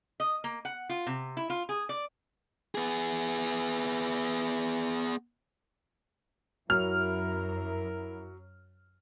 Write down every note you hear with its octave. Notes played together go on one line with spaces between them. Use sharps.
D#5
A#3
F#5
F4
C3
E4
F4
G#4
D5
B3 G#4
F#2 F#3 E4 A#4 F6